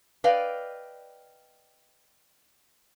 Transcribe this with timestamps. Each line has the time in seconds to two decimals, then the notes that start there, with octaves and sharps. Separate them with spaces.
0.24 B4 D5 D#5 F5 G5